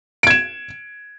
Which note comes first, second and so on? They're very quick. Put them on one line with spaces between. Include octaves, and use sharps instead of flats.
D7 G#6 E7